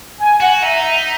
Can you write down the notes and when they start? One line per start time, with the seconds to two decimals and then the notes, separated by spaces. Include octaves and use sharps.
0.18 G#5
0.40 F#4 F#5
0.62 D#4 E5
0.83 E5